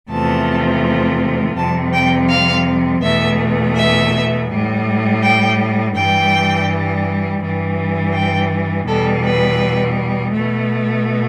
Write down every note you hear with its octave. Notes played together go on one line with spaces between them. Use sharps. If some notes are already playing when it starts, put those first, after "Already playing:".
E2 C3 F3 A3 A5
F2 C3 G3 A5
G5
F5
E2 B2 A3 E5
E5
A2 G3
G5
G2 E3 G3 G5
G2 E3 G3
G5
E2 B2 G3 A4
B4
B2 A3